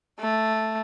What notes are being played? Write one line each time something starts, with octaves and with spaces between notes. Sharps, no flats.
A3